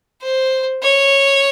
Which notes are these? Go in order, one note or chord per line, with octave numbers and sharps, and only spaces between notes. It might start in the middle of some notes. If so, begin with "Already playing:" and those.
C5
C#5